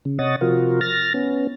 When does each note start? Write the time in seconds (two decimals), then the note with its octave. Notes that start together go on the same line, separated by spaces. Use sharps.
0.05 C#3
0.19 C3 C#5 D#5 F#5 D#6 A6
0.41 C3 F3 F4 F#4 A#4
0.81 F6 A6 A#6
1.14 B3 C#4